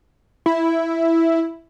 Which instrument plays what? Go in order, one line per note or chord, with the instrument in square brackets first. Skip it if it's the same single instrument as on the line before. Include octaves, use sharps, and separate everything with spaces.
[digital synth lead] E4